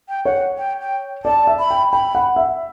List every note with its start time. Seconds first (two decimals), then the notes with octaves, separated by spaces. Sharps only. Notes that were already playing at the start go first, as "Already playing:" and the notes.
0.09 G5
0.25 C#5 F#5
0.58 G5
0.81 G5
1.25 D5 A5
1.47 E5
1.59 B5
1.71 G5
1.92 G5 B5
2.15 F#5
2.36 E5